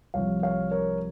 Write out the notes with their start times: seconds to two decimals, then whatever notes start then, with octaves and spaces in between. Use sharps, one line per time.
0.14 C2 C3 F3 C#5 F5
0.43 C#5 F5
0.71 A#4 C#5